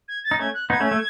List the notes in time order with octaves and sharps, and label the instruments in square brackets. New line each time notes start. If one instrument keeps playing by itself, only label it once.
[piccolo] G#6
A6
[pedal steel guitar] D#4
[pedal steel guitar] A3 C#4 [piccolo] G#6
[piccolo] F#6
[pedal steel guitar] B3 D#4 [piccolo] G#6
[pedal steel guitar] A3 C#4
A3